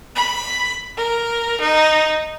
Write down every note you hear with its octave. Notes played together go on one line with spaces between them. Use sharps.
B5
A#4
D#4